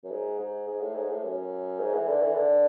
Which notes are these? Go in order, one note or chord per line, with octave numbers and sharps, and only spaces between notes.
F#2
G#2
G#2
G#2
A2
G#2
A2
F#2
G#2
E3
D3
E3
D3